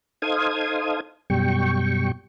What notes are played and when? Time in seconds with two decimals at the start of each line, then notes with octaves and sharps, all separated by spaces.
0.22 D#4 A4 C5 F5 D#6 G#6
1.30 F#2 B2 G3 G5 C#6